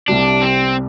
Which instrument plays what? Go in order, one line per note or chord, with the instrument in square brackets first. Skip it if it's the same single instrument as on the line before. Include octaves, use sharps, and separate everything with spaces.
[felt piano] C2 C3 G3 [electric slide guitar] D4
[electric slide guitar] C4